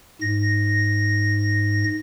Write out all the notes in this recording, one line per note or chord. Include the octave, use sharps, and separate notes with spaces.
G#2 A#6